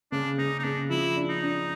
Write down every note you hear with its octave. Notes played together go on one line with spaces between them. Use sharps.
C#3 D4
C#3 D#4
D#4
C#3 D4
F3 E4
D4
D#4
D4